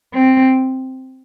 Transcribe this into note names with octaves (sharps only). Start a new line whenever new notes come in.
C4